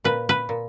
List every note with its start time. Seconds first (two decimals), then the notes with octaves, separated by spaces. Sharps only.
0.04 A#2 B4
0.29 B4
0.49 A#2